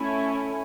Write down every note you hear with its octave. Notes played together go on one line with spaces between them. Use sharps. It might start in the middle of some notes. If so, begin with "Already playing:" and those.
Already playing: A3 C#4 E4